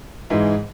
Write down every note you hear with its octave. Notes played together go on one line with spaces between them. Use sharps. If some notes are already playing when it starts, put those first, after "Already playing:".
G#2 E3 G#3